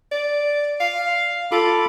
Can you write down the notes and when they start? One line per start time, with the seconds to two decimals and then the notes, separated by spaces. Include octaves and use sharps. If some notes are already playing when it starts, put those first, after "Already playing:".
0.12 D5
0.80 F5
1.52 F4 A4 B5 D6